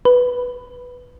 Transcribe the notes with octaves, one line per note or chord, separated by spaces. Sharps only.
B4